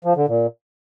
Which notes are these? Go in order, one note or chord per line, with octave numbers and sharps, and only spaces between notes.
F3
D3
A#2